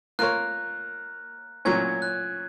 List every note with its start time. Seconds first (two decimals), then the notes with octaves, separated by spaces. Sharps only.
0.19 A#3 F4 A#4 C#5 F#6
1.65 A#2 F#3 C#4 G#6
2.02 F#6